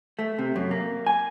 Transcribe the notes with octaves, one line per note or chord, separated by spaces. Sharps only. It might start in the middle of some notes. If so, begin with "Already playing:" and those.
A3
C3
F#2
A#3
G#5